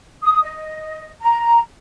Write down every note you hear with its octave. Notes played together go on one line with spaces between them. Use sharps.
D#6
D#5
A#5